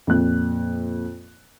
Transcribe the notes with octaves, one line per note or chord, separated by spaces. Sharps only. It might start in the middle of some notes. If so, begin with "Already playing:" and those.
F2 A#2 F#6